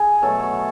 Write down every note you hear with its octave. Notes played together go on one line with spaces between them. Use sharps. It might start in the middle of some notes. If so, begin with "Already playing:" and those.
Already playing: G#4
B2 F#3 A3 A4